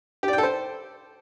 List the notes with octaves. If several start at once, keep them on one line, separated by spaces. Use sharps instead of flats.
G4
D5
G5
A4
C5